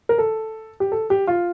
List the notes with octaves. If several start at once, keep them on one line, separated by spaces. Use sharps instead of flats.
A#4
A4
G4
A4
G4
F4